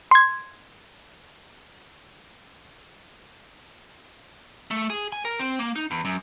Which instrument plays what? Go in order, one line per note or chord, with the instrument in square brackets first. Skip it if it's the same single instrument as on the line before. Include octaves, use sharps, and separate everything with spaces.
[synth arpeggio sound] C6 G#6
[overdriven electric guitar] A3
G#4
G#5
A#4
C4
A#3
D#4
E2
F#2